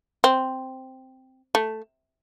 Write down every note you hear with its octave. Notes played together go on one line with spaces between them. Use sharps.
C4
A3